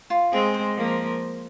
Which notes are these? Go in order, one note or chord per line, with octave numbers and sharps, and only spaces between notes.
F4
G#3 C4 G#4
C5
F3 A#3